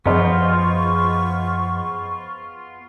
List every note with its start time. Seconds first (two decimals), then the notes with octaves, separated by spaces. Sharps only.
0.06 F#2 F3 B3 F4 G#4 C5 D#5 C#6